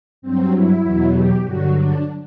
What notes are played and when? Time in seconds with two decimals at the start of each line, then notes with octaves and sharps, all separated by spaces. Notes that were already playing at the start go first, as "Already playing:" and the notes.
0.22 G2 F#3 C4
0.53 E4
0.83 E2 B2 F#3
1.14 G4
1.44 G2 D3 F#3 F#4
1.74 D4